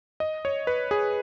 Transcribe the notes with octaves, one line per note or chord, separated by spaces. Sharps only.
D#5
C#5
B4
G#4